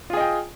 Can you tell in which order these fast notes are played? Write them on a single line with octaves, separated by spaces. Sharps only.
F4 G#4 D#5 G5